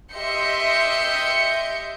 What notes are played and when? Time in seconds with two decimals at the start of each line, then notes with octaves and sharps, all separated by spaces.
0.13 G4 D#5 E5 C6 G6 C#7